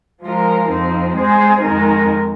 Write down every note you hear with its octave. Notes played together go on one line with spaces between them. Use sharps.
F3 G#3 F4 A#4
F2 F3 C4 D#4
G#3 C4 G#4 C5
F2 D#3 G#3 D#4 A#4